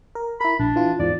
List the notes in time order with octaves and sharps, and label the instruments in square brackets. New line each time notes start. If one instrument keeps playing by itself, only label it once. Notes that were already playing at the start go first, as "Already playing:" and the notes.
[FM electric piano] A#4
[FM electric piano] E4 A#4 [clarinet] B5
[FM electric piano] A#1 [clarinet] D4
[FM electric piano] E3 F4
[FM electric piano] E2 G#2 F3 [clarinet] D5